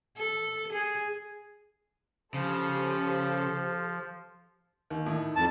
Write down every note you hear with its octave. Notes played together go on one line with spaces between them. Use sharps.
A4
G#4
C#3 F3 G4 A4 C5
D#2
A2 D#3
F2 A5